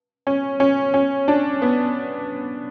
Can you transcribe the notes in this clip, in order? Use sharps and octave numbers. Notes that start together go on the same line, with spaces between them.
C#4
C#4
C#4
D4
B3